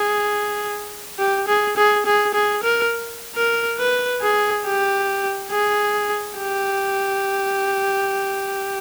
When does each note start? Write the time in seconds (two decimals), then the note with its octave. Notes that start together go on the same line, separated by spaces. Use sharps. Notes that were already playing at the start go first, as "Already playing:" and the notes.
Already playing: G#4
1.19 G4
1.48 G#4
1.77 G#4
2.06 G#4
2.34 G#4
2.63 A#4
3.35 A#4
3.78 B4
4.21 G#4
4.65 G4
5.51 G#4
6.38 G4